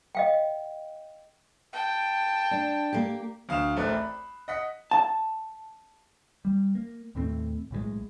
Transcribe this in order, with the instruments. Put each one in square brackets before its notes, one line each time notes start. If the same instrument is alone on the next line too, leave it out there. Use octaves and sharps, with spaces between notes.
[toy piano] D#5 F5 G5
[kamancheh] G5 A5
[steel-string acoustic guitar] D4
A#3 G4
[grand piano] D2 F5 D#6 E7 F7
A1 A3 C4 A#4 D5 F#6
B5
D#5 F#5 B6
[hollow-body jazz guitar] A5
[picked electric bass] G3
A#3
D#2 A2 A3 C4
B1 A2 F3 G#3